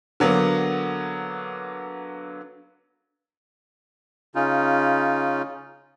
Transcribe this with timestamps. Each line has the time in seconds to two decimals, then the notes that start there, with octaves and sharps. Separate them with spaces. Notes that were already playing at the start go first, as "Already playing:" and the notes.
0.20 D3 F#3 A#3 B3
4.35 C#3 C#4 D#4 F4